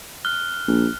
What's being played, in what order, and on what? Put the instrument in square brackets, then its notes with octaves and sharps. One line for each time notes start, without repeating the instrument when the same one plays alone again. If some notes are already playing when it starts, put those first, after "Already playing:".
[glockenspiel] F6 F#6 G7
[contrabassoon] A#1